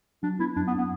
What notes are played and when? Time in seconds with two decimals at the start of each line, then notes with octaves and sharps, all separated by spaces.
0.23 F#3 D4
0.39 B3 E4
0.56 F#2 D4
0.67 B3
0.78 B3